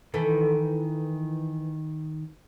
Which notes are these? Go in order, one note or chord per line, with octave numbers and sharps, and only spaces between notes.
D#3 E3 A4